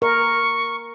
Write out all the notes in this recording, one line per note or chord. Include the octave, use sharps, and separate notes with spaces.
A#4 C#6